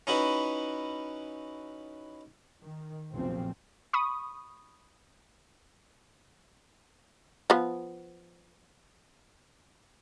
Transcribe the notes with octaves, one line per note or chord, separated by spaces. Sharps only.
C#4 D#4 E4 F#4 B4
D#3
F1 B1 A#2 F3 C4 C#4
B5 C#6 D#6
F3 B3